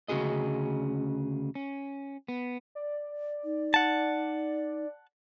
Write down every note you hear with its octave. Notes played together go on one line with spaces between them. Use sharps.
D2 C#3 C#4 F#4 G#4 D#5
C#4
B3
D5
D#4
F#5 A5